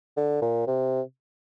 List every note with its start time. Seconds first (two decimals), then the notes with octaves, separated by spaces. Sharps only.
0.17 D3
0.42 A#2
0.67 C3